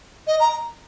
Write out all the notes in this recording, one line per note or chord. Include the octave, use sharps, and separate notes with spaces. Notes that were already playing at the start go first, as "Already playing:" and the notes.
D#5
A#5